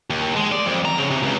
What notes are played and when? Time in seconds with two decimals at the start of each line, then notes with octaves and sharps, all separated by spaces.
0.10 D#2
0.36 G#3
0.52 D5
0.66 F2
0.85 A#5
0.98 C#3
1.11 C3
1.23 C#2